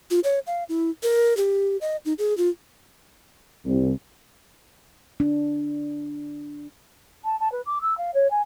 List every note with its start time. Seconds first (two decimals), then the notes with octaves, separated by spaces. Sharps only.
0.11 F4
0.24 C#5
0.47 F5
0.69 E4
1.03 A#4
1.37 G4
1.81 D#5
2.05 D#4
2.19 G#4
2.38 F4
3.65 C2
5.20 D4
7.25 A5
7.40 A5
7.52 B4
7.66 D6
7.82 E6
7.98 F5
8.14 C#5
8.31 G#5